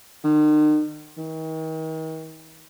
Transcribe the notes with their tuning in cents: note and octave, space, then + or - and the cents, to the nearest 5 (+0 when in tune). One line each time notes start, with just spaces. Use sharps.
D#3 -40
D#3 +40